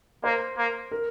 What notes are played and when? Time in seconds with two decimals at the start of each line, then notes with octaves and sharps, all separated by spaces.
0.24 A#3 C5
0.58 A#3
0.92 A#4